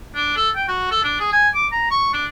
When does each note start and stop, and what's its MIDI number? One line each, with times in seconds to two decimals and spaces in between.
0.16 0.34 62
0.37 0.50 69
0.55 0.64 79
0.68 0.89 66
0.91 1.02 69
1.04 1.20 62
1.20 1.29 68
1.33 1.49 80
1.55 1.67 86
1.72 1.87 82
1.91 2.11 85
2.13 2.26 62